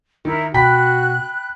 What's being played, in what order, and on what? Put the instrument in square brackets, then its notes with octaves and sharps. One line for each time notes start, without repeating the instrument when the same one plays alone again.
[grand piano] D#3 [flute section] E4 A#4
[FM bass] B2 [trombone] F#4 [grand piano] G5 B5 B6 [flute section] F#6